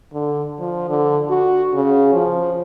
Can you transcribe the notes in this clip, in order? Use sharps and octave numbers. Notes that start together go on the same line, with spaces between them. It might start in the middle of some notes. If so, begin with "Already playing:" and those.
D3
F3
D3
F#4
C#3
F3